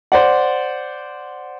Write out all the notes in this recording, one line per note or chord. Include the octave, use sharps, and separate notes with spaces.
C5 D5 F#5